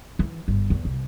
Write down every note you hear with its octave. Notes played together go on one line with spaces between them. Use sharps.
E3
G1
E2
C2